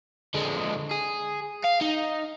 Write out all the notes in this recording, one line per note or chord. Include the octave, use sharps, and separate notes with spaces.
D3 G#3
G#4
F5
D#4